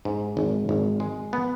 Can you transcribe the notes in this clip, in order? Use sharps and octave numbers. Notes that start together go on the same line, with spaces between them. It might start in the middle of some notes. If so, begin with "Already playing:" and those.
G#2
G#1
G#1
G#3
B3